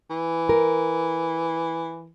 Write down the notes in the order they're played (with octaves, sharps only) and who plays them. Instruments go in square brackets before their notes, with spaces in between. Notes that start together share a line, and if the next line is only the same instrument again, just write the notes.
[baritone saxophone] E3
[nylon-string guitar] A#4